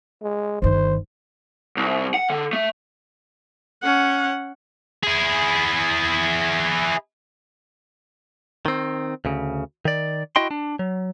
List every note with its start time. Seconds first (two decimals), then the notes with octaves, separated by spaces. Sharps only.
0.22 G#3
0.62 G1 D#3 C5
1.77 C2
2.14 F#5
2.30 D3
2.53 A3
3.83 C#4 F#5
5.04 E4 G#4
8.66 D#3 C4
9.25 D2 C#3
9.85 D#3 D5
10.36 E4 F#4 D#5 G5 C6
10.51 D4
10.79 F#3